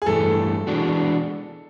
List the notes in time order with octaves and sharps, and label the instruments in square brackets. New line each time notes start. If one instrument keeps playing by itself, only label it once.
[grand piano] G#4
[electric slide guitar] G2 E3 A3 [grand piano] A4
[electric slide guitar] E3 G#3 B3 D4 F#4